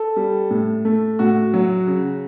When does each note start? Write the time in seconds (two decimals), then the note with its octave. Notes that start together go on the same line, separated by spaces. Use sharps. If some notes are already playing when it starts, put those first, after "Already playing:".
Already playing: A4
0.16 G3
0.50 A2
0.85 A3
1.19 A2 F#4
1.54 F#3
1.87 C#3